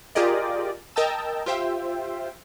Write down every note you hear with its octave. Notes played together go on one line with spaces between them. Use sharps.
F4 G4 G#4 A#4 D5 D#5
A#4 D#5 G5 A5 E6
F4 G4 C5 E5 G5